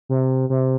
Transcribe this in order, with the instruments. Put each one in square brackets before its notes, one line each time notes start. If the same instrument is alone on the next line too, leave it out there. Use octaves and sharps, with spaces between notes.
[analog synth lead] C3
C3